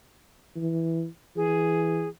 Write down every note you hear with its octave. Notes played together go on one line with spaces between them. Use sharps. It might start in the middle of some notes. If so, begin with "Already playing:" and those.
E3
E3 G#4